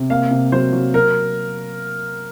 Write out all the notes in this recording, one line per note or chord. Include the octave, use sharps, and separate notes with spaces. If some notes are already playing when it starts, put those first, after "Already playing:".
Already playing: C3
A#3 F5
C3
F#3 C5
F#3
F#3 A#4